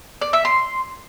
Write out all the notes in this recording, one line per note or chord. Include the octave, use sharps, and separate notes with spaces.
D5
E5
C6